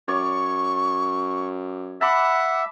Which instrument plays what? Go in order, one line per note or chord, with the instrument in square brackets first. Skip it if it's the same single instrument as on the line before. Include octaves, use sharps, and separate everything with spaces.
[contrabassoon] F#2 [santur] C#5 D5 [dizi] C#6
[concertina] E5 [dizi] F#5 [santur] A5 B5 D6